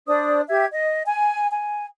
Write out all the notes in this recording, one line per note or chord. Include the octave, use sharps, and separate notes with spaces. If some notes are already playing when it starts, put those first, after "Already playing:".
D4 C5 D5 D#6
G4 E5 G#6
D#5
G#5
G#5